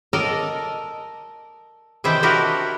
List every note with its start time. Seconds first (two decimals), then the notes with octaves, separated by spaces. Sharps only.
0.13 A4 A#4 D5 D#5
2.04 C3 D#3 E3 C5 E5 G5
2.23 D4 E4 F#4 G4 A#4 D#5